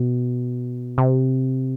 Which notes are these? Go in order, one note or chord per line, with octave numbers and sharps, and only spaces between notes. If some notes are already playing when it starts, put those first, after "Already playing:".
Already playing: B2
C3